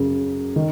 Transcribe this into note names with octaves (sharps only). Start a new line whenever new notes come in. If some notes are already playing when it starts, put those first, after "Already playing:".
Already playing: F#2 C#3
D#3